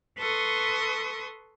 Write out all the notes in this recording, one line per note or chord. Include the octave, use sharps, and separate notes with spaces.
A4 B4 C6 C#6 D#6